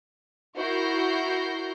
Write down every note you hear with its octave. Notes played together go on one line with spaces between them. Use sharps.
E4 F#4 A#4 G6 A#6 C7